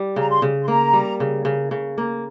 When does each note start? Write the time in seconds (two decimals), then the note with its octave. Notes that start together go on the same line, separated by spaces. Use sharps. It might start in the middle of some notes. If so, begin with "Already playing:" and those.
Already playing: G3
0.16 C#3 A#5
0.29 C6
0.42 C#3
0.63 C6
0.68 A#3 A#5
0.93 G3
1.20 C#3
1.45 C#3
1.71 C#3
1.98 A#3